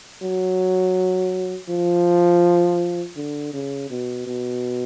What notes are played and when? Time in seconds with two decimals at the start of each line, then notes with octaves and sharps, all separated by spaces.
0.22 F#3
1.69 F3
3.16 D3
3.53 C#3
3.90 B2
4.27 B2